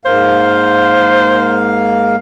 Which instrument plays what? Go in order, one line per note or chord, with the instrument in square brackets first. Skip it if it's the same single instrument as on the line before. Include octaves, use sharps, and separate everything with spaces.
[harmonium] G#2 A#3 F5 [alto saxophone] C5